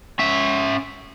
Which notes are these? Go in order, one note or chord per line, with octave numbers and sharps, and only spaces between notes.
C#4 E5